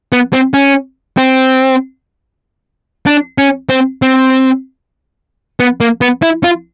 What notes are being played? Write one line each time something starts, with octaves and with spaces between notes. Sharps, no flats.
B3
C4
C#4
C4
D4
C#4
C4
C4
B3
A#3
B3
E4
F4